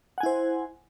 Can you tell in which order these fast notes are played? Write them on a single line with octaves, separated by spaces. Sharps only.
F#5 G#5 E4 C5